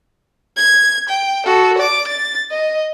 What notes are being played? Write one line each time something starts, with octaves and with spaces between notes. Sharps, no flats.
G#6
G5
F#4 A4
D5 D6
A6
D#5